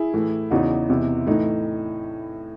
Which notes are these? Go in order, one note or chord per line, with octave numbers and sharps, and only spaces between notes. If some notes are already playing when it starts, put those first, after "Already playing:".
Already playing: E4 G#4
A2 E3
E2 C#3 E3 D#4 F#4
E2 C3 E3
A2 E3 D#4